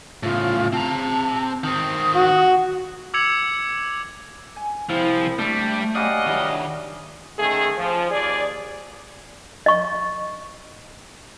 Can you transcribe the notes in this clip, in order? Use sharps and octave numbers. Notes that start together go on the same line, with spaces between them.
A2 C#3 F4
C4 A5 A#5
D#3 C4 D#6
F#4
D6 E6 G#6 C#7 F7 F#7
G#5
C2 F3 C4 E4
G3 A3 D4
F#3 G3 C#4 D5 D#5 F5 F#5
D#3 F#3 G3 D4 E5
D#3 A3 C#4 G#4
F3
D#2 G#4 D5
D#5 C#6